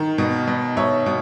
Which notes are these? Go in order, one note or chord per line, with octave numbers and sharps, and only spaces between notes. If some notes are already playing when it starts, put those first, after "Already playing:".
Already playing: D#3
B2
B2
B2 C#5 E5
B2